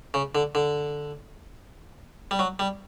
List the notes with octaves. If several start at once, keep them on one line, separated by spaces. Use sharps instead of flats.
C#3
D3
D3
G3
F#3
G3